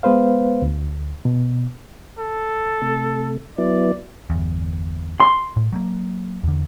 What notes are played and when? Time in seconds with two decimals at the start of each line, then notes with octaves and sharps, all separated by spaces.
0.03 G#3 B3 B4 C5 F5
0.62 D2
1.25 B2
2.19 A4
2.82 C3 A3
3.58 F#3 B3 E4 D5
4.30 G1 E2
5.20 C6
5.56 A2
5.72 F#3 A3 A#3
6.43 E2 D3